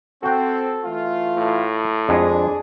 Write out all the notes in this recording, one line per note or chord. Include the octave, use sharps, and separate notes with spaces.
C4 F#4 A4 G5
E3 A3 F4
A2
F2 G#3 D4 G#4